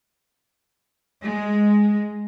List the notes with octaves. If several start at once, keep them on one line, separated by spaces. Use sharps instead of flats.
G#3